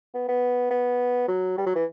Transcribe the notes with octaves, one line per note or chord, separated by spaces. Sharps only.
B3
B3
B3
F#3
G3
F#3
E3